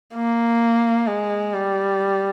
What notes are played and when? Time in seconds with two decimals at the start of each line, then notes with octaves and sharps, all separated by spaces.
0.15 A#3
1.07 G#3
1.54 G3